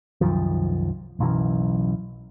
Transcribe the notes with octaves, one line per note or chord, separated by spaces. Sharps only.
C2 F#2 D#3 F3
F#1 B1 F#2 E3